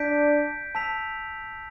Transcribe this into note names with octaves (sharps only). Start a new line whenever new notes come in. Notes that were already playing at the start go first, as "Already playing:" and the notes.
Already playing: D4 G6 B6 D7
A5 E6 B6 F7